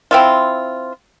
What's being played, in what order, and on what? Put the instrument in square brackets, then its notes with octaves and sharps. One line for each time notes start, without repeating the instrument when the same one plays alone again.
[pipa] C4 E4 F4